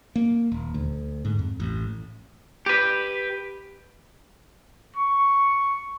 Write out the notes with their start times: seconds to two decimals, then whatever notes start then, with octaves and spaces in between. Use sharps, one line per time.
0.16 A#3
0.52 D#1
0.74 D2
1.25 G#2
1.39 F2
1.60 A1
2.66 G4 B4
4.96 C#6